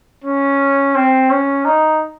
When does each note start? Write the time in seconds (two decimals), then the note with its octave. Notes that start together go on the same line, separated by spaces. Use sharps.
0.24 C#4
0.95 C4
1.30 C#4
1.65 D#4